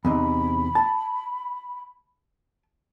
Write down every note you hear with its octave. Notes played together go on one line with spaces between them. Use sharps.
E2 C3 D#4 B5
A5